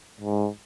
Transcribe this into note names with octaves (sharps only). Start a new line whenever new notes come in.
G#2